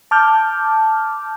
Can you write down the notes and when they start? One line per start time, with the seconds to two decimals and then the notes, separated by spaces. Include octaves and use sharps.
0.11 A5 D6 F6 G6